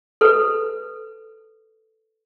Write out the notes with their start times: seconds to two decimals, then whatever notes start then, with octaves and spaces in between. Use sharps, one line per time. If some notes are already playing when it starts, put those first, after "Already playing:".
0.21 A4 B4